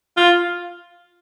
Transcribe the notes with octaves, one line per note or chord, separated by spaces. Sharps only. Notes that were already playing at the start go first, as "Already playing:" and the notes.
F4